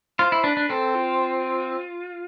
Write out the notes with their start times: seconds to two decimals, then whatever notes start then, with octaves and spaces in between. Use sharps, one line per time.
0.19 F4 C5
0.32 E4
0.44 D4 B4
0.57 D4
0.69 C4 A4
0.95 F4